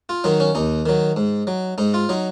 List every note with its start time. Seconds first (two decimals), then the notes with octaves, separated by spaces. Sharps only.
0.09 F4
0.24 D#3 F#3 D#4
0.40 C#4
0.55 D#2 D#4
0.86 D#3 F#3
1.16 G#2
1.47 F#3
1.78 G#2 D#4
1.94 F4
2.09 F#3 D#4